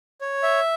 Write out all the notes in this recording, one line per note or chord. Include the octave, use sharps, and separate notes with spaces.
C#5
E5